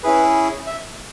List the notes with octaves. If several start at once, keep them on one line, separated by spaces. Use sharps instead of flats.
C#4 E4 G#4 B4
E5